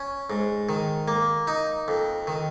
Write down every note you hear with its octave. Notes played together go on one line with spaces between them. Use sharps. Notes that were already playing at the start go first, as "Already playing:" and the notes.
Already playing: C#4
G#2
D#3
A#3
D#4
F2
D#3